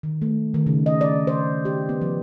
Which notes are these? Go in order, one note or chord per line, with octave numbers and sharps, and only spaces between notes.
D#3
A3
D#3
C#3
D#5
D5
C5
G4
B3
F3